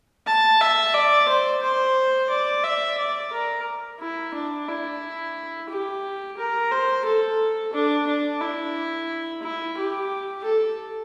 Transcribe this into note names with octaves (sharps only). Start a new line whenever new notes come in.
A5
E5
D5
C5
C5
D5
E5
D5
A#4
E4
D4
E4
G4
A#4
C5
A4
D4
D4
E4
E4
G4
A4